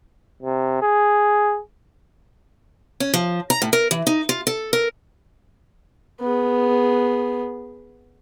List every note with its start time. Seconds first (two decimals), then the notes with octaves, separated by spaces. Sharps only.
0.42 C3
0.82 G#4
3.00 C#4
3.14 F3
3.50 A#5
3.62 A2
3.73 A#4
3.91 E3
4.07 D#4
4.29 F4
4.47 A4
4.73 A#4
6.21 B3 G#4